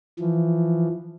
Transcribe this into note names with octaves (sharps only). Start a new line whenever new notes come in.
E3 F3